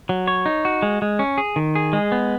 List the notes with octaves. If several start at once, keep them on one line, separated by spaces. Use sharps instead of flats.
F#3
C#5
D#4
F#4
G#3
G#3
C#4
G#4
D#3
G#4
G#3
B3